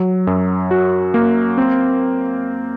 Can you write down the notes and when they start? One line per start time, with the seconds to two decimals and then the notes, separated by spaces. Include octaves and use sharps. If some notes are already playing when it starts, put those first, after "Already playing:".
Already playing: F#3
0.27 F#2
0.71 F#4
1.14 A#3
1.58 C4